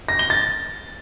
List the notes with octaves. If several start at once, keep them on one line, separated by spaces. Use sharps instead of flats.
A#6
G7
A6